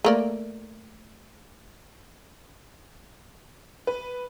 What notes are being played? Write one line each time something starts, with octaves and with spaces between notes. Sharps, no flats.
A3 A#3 D5
B4